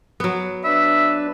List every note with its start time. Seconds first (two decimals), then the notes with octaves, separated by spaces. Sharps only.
0.20 F#3 B3
0.64 D4 B4 E5